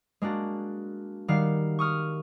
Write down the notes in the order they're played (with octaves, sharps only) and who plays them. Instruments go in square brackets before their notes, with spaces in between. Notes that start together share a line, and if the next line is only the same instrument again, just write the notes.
[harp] G#3 A#3 D4 F#4
D#3 G3 F5 F#5 C7
C#6 D#6 F6